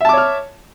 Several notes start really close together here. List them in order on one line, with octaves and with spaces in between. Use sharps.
E5 A5 D6 C#5 F6